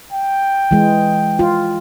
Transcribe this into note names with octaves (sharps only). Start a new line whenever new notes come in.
G5
E3 G#3
F4